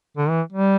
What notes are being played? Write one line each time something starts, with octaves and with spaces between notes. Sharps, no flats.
D3
E3
G3